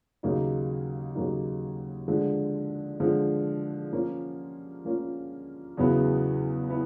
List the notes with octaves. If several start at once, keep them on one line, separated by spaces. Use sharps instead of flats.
D#2 C#3 F#3 A#3 D#4
D#2 C#3 F#3 A#3 D#4
D3 F3 G#3
D3 F3 G#3
F3 A#3 C#4 F4
F3 A#3 C#4 F4
E2 C#3 F#3 B3 E4
B3 E4